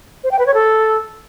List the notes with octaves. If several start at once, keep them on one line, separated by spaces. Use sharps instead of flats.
C5
G5
B4
C#5
A4